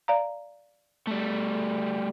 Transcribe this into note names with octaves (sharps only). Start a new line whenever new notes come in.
D5 F5 A#5
G3 A3